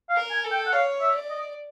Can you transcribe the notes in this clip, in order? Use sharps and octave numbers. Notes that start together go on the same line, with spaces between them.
F5
A#4
G#5
A4
G5
F#5
C#5 F5
E5
D5
D#5